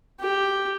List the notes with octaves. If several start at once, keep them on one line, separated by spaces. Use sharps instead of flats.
G4